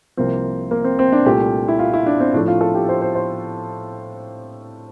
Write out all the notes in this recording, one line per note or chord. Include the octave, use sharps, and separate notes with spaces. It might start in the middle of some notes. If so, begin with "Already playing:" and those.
C2 C3 F3 A#3 C4
A#3
C4
C4
D4
C2 A#2 A3 G4
E4
F4
E4
D4
C4
A2 F3 A3 D4
F4
A4
G4
C5
C5
C5